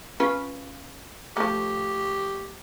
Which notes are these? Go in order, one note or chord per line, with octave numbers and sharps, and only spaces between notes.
C#4 F4 B4
F3 A3 G4